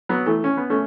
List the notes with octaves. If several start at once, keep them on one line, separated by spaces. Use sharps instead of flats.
F#3 B3
E3 A3
C#4
B3
A3 C#4